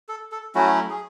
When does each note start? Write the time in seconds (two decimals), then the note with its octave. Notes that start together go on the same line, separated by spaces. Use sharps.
0.09 A4
0.32 A4
0.55 F#3 A3 C#4 E4 F#4
0.90 G#4